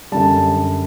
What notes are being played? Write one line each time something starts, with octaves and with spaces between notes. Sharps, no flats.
F#2 D3 G3 A5